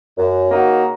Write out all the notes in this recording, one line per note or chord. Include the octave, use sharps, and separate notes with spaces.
F#2
C#3 A#3 D#4 F#4